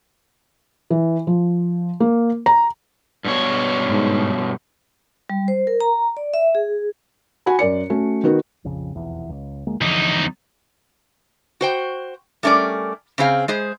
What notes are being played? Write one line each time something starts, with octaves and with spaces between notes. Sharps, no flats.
E3
F3
A#3
A#5
G2 B2 C#5
G#2
G3
C5
A#4
A#5
D5
E5
G#4
F#4 F#5 G#5 B5
F#2 A#4 D5 C#7
A3 C#4 F#4
D#3 B3 F#4 A#4
A#1 F2 C#3
F1 B1 E2
C#2
D2 G#3 A#3
E2 D3 F3 D#4
F#4 C5 G5
G3 A3 C#4 A#4 D5
C#3 C4 G#4 F5
G#3 G#4 C5